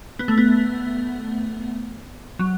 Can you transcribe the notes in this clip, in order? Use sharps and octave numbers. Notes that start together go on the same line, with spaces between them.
B3
A3
B3
F#3